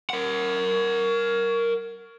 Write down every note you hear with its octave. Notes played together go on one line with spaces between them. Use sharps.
A#4 F#5